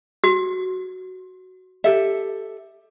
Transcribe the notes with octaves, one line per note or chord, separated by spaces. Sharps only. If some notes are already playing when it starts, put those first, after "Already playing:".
F#4
G4 A4 E5